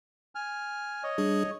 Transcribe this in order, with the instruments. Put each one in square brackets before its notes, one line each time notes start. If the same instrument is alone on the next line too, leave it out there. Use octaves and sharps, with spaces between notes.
[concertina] G#5 F6
C#5 D#5
[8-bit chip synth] G3 D4 G#4